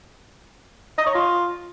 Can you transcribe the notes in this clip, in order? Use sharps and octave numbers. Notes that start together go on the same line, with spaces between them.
D#5
C#5
F4